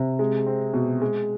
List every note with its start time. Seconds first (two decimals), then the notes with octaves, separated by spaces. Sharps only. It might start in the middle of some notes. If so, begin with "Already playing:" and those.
Already playing: C3
0.19 G#3
0.46 C4
0.74 B2
1.02 G#3